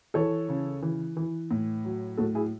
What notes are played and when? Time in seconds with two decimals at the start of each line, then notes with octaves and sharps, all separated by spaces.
0.14 E3 A4 C#5
0.49 C#3
0.82 E3
1.17 E3
1.51 A2
1.85 F#3
2.17 A2 F#4 A4
2.35 E4 G#4